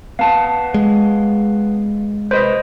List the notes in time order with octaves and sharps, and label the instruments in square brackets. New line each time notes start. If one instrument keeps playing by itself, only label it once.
[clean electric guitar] B3 A5 [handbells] F5
[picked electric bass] G#3
[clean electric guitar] B4 D#5 [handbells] C5